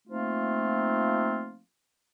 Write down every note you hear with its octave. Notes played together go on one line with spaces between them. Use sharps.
F3 A3 A#3 C4 D#4 F4